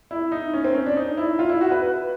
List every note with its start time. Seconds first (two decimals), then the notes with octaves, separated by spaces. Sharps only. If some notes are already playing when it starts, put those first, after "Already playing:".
0.11 E4
0.32 D#4
0.54 C#4
0.64 C4
0.74 C#4
0.86 D4
0.97 D#4
1.17 E4
1.39 F4
1.49 E4
1.61 F#4
1.72 B4
1.82 B4